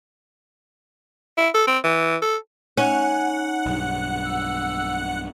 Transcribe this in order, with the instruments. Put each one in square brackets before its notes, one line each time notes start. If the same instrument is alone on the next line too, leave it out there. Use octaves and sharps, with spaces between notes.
[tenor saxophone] E4
A4
C4
E3
A4
[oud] C#4 [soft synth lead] D#4 [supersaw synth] F#5
[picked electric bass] B1 G2
[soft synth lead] E6